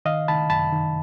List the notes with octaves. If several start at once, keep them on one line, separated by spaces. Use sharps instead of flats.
D#3 D#5 F5
D#3 A5 B5
F#2 A5 B5
D#3